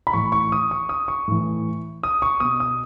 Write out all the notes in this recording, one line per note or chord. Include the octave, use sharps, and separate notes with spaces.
B5
A2 E3 C#6
C#6
D#6
C#6
D#6
C#6
A2 E3
D#6
C#6
B2 D#6
D#6